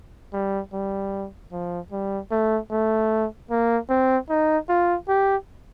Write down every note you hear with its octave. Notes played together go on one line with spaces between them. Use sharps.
G3
G3
F3
G3
A3
A3
A#3
C4
D#4
F4
G4